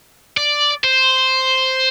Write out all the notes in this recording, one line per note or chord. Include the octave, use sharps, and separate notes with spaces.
D5
C5